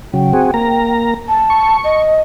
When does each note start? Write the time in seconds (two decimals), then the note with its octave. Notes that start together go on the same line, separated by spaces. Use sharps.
0.14 C#3 F#3 G5
0.33 C4 F#4 G#4
0.54 A#3 A#5
1.28 A5
1.50 C#6
1.84 D#5